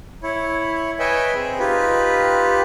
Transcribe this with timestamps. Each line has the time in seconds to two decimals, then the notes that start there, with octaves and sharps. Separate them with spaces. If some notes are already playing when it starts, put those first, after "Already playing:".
0.23 E4 C#5
0.99 B4 C#5 D#5 E5 G5 G#5
1.35 C4 G#4
1.59 D#4 F4 G4 B4